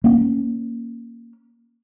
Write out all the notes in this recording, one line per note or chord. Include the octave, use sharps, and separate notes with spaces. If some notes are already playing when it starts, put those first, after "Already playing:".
A#3 C#4